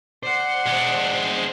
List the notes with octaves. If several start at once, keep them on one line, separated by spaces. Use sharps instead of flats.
C5 D5 F#5
G#3 D4